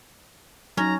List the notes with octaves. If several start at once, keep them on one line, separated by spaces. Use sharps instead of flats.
F#3 C#4 D#4 A#5